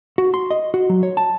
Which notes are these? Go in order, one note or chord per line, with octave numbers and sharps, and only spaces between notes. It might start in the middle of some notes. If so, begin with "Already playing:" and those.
F#4
C6
D#5
F#4
F#3
C#5
A5